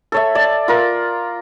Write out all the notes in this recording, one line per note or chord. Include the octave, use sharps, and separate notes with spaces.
A4 C#5 E5
D5 A5
F4 A#4